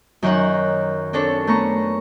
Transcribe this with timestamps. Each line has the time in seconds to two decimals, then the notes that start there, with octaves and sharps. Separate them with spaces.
0.22 F#2 D#3 F#4 C#5 F#5
1.13 C4 D4 A4 C#5
1.47 A3 B3 A#5 C#6